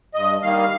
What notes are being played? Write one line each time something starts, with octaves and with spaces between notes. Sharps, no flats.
G2 D#5
D#3 G3 A#3 F5